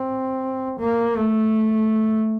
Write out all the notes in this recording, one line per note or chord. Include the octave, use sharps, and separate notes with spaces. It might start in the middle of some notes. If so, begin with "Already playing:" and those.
Already playing: C4
A#3
A3